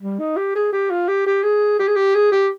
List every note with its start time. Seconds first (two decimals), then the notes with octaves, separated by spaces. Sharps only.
0.02 G3
0.19 D#4
0.37 G4
0.55 G#4
0.72 G4
0.90 F4
1.08 G4
1.26 G4
1.43 G#4
1.79 G4
1.87 G#4
1.96 G4
2.14 G#4
2.32 G4